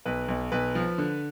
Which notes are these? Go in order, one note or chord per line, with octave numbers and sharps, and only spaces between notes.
B1 B4
B1
B1 B4
F3
D3